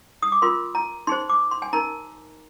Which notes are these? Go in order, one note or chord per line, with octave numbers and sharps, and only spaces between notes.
D#6
D6
F4 A#4 C6
A#5
D#4 G#4 C5 C6
D6
C6
G#5
D#4 A#4 A#5